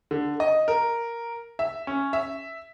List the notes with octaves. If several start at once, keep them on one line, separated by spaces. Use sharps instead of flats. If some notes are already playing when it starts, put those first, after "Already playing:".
D3
D#5
A#4
E5
C#4
E5